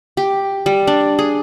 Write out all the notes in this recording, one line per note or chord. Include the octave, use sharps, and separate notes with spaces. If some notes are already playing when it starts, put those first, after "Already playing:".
G4
G3
D4
G#4